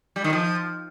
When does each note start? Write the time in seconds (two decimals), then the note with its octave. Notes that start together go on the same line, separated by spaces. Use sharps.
0.16 G3
0.24 D#3
0.33 F3